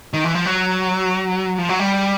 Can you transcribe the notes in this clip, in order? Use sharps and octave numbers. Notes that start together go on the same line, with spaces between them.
D#3
E3
F3
F#3
F3
F#3
G3